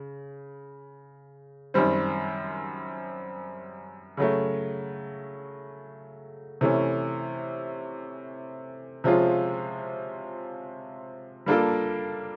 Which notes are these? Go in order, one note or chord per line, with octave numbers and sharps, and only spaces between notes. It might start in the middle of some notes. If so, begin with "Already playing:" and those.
Already playing: C#3
F#2 D#3 G3 C4
C#3 F#3 A3
C3 E3 A3 C#4
C3 F3 G#3 C#4 F4
G3 A#3 D4 F4 A4